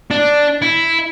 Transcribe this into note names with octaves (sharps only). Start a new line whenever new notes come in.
D4
E4